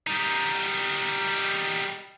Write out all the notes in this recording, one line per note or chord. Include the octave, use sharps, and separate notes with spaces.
G3 D#4